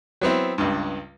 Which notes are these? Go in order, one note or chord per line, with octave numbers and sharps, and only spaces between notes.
F#3 B3 C4 E4
C#2 G2